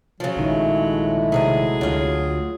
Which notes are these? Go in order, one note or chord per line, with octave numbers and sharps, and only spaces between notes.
C#3 F3 F#3
A#1 D#3 G#3 A3 E4
C3 F#3 G#4 D#5
D2 F#3 F4